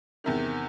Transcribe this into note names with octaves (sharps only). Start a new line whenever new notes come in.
E2 C3 D#3